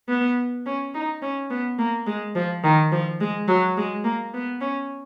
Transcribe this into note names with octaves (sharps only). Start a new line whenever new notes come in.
B3
C#4
D#4
C#4
B3
A#3
G#3
F3
D#3
F3
G#3
F#3
G#3
A#3
B3
C#4